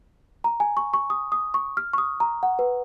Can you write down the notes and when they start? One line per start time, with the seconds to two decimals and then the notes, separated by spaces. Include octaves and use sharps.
0.44 A#5
0.60 G#5
0.77 C#6
0.94 C#6
1.10 D#6
1.32 D#6
1.54 C#6
1.77 F6
1.93 C#6
1.98 D#6
2.20 A#5
2.43 F#5
2.59 B4